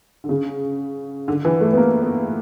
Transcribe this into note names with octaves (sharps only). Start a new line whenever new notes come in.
D3
C#3
D3
E3
A3
B3
A#3
B3